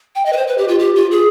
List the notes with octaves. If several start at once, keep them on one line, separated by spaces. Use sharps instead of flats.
G5
D#5
B4
C5
B4
G4
F4
G4
F4
G#4